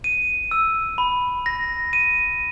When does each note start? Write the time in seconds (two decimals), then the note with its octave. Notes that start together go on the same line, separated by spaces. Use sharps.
0.04 D#7
0.51 E6
0.98 B5
1.46 A#6
1.93 D#7